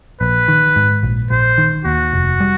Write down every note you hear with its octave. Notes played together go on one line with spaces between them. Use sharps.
A#1 B4
D#3
G#2
A#1
A#1 C5
D#3
D#2 F#4
F1
G3